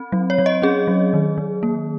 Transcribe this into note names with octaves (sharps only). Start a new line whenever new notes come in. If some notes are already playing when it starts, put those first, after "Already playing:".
Already playing: C4
F#3
C#5
F#3
D#5
C#4 G#4
F#3
D#3
D#3
A#3